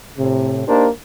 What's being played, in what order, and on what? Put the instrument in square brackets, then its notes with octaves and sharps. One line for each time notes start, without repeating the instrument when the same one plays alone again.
[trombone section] A2 C3
A#3 D4 D#4 G4 A#4 C5